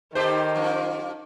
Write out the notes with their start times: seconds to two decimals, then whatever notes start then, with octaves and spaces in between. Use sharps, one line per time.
0.15 D#3 D#4 G4 A4 C5
0.55 F#2 F3 A#3